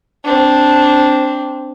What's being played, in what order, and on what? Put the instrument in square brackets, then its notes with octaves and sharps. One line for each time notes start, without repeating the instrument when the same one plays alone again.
[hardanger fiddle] C4 D4